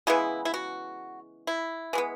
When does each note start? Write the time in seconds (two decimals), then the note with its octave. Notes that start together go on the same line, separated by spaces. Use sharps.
0.07 C#3 E3 G#3 B3 E4
0.45 E4
0.54 F#4
1.47 E4
1.93 E3 G#3 B3